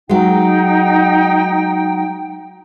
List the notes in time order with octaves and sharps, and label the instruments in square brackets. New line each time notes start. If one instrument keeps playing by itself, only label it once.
[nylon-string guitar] F#3 G#3 [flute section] D#4 G5